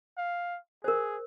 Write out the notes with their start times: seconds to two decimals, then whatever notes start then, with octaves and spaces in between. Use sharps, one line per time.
0.17 F5
0.84 G#4 A#4 C5